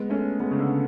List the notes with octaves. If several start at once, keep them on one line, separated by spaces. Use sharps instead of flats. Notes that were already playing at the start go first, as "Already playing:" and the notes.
Already playing: G#3 B3
A3 C#4
G#3 B3
C#3
D3